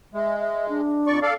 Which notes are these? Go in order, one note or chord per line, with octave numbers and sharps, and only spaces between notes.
G#3 E5
E5
D4
F2 D5 C#6
A4 D5 F5